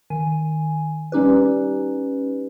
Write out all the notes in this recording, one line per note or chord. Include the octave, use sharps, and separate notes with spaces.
D#3 G#5
G3 C#4 D#4 G4 B4